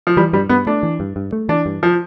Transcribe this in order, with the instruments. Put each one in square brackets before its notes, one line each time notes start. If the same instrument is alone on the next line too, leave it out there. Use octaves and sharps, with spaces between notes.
[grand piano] F3
[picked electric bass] E3 [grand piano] G3
[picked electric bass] G2 [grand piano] G3
[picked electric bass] G2 [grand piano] B3
[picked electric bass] A3 [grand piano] D4
[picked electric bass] E3
G2
G2
A3
[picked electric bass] E3 [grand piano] D4
[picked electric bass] G2
[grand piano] F3